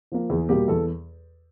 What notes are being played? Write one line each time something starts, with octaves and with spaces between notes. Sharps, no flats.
F3 A#3
E2 G#4
B2 G3 A#3 G4
E2 A4